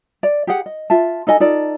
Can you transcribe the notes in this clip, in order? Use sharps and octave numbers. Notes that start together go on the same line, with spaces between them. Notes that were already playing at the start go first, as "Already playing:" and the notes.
D5
G4 G#4 F#5
D#5
F4 E5 A5
D#4 A4 D#5 G#5
D#4 F4 A4 D5